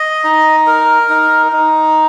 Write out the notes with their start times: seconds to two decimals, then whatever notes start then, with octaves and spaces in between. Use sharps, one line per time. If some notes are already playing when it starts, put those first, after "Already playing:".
Already playing: D#5
0.24 D#4
0.67 A#4
1.09 D#4
1.52 D#4